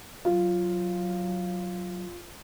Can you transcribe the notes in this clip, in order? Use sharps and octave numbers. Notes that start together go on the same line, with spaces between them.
F#3 F4